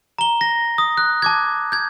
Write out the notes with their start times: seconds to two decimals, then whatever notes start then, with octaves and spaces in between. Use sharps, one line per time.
0.19 A#5 G7
0.41 A#6
0.78 D#6
0.97 F#6
1.22 A5 D6 G#6
1.72 G6 G#6